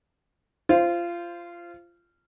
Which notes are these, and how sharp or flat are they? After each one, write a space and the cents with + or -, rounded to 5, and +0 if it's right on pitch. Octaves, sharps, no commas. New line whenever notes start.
F4 -20 C5 +0